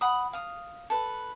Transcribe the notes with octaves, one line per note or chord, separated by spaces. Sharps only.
F#5 B5 D#6
F5 D#6
A4 B4